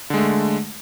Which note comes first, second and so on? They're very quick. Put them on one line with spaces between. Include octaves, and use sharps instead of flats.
D3 G#3 A3